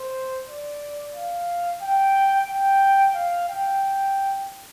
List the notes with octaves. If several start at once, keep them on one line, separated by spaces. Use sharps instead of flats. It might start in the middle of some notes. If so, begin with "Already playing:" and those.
Already playing: C5
D5
F5
G5
G5
F5
G5